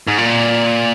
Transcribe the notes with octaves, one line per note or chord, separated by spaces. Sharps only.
G#2
A#2